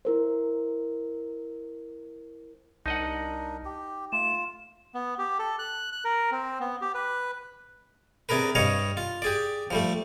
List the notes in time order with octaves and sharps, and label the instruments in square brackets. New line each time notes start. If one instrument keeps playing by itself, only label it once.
[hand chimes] E4 A#4 C5
[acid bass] C2 [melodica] D4 A#4 [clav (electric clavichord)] D#4 D#5 F#5
[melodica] G4
[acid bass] A3 [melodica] F4 [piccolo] E7
[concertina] B3
G4
A4
F#6
F#6
A#4
C4
B3
G4
B4
[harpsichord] C3 D4 G#4 A#4 B4
G2 G3 C#5 D#5 F5
F4
G4 G#4 D5
F3 G3 A3